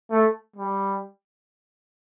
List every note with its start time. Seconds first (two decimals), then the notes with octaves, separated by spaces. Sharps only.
0.11 A3
0.56 G3